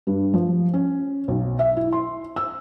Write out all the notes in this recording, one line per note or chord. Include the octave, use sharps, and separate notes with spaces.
G2
F3
C#4
B1
E5
E4
C6
E6